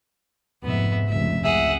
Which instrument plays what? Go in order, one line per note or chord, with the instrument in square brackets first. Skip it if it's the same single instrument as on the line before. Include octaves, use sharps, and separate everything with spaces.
[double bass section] F1 G#2 [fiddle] B3 E5
[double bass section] F1 C#2 G#2 [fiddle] E5
[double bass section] C#2 [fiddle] G#4 F#5 [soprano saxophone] E5